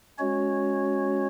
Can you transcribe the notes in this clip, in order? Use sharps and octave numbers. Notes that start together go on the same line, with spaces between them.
G#3 C#4 F#4 C#5